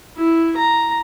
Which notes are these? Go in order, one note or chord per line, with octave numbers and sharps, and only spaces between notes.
E4
A#5